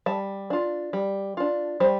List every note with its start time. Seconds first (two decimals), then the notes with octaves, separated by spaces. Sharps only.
0.06 G3 A5
0.50 D4 F4
0.93 G3
1.37 D4 F4
1.80 G3 C5